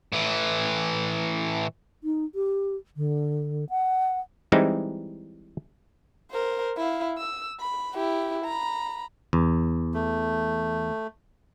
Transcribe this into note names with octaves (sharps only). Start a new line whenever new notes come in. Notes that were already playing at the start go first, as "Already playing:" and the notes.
A2 E3
D#4
G4
D3
F#5
E3 G3 G#3 C4 D#4 E4
A#4 C5
E4 F5
E6
B5
E4 G4
A#5 B5
E2
A3